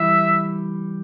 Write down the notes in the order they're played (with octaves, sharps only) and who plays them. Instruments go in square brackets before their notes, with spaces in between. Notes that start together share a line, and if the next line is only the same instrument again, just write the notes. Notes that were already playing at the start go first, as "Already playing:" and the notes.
Already playing: [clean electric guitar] E3 G3 [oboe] E5